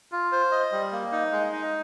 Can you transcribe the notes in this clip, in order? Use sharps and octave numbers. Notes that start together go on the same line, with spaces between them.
F4
C5
D#5
G3
A#3
D#4
G#3
D#4